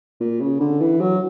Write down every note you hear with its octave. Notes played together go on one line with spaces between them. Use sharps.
A#2
C#3
D3
E3
F#3